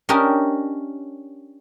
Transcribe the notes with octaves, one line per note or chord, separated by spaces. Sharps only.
C#4 D4 G4 A#4 D#5